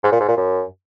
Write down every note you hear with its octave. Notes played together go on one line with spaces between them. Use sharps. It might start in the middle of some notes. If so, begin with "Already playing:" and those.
G#2
A#2
G#2
A#2
F#2